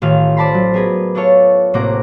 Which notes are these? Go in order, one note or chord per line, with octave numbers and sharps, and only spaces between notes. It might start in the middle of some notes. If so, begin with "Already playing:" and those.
A1 D#3 F4 F5
C5 D5 A5 B5 C6
F#3
B3 G#4 A#4 B4
D4 E4 F4 A4 C#5
A1 C3 A#3 F#5 A#5 D6